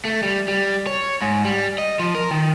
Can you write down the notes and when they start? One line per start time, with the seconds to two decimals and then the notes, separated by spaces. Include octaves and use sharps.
0.05 A3
0.23 G3
0.48 G3
0.87 C#5
1.22 G#2
1.45 G3
1.78 D#5
1.99 F3
2.15 A#4
2.31 D#3